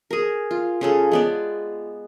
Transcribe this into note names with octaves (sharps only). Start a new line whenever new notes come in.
G#4 A#4
F4
C#3 G#4 A4
G#3 B3 D5